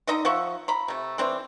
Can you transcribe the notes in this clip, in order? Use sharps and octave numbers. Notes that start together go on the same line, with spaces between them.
D3 D#4 D#5 A#5
F3 E5 F#5 C#6
A#5 B5
C3 A3
E3 A3 C4 D4